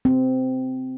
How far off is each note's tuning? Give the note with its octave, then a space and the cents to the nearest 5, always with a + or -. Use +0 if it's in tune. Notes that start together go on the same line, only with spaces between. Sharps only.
C4 -15